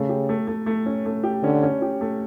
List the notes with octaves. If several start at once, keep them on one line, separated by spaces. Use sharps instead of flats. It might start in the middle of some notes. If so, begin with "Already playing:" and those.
Already playing: C#3 A3
G4
A3
A3
A3
C#4
A3
G4
D3 C#4
C#4
G4
A3